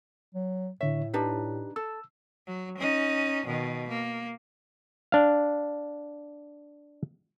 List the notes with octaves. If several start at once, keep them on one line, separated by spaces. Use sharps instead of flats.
F#3
A2 D3 C#5 E5
D4 D#4 G4 B4
A4 E6
F#3
C#4 D#4
B2 D#3
A#3
D4 F5